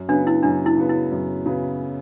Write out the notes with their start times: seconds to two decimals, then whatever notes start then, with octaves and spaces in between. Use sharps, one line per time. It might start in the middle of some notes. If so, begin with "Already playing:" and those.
Already playing: F#2
0.09 C#3 F#3 B3 D4
0.27 E4
0.43 F#2 D4
0.66 E4
0.77 C#3 F#3 B3
0.89 E4
1.12 F#2
1.46 C#3 F#3 B3